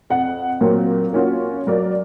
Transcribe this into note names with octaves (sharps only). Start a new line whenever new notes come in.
F2 F#5
A#2 F#3 A#3 C4
A#3 C#4 F4 F#4
F#3 A#4 D5